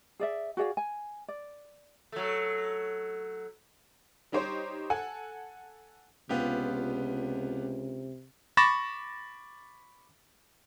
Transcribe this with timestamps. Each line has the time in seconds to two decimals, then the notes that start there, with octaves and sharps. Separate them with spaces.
0.20 G#4 D5 E5
0.57 F#4 G#4 D5 F5
0.77 G#5
1.28 D5
2.12 F#3 A3
4.32 G3 D#4 G4 C5 C#5
4.90 A4 F#5 G#5
6.29 C#2 C3 B3 F4 G4
8.57 B5 C#6 D6 A6 A#6 E7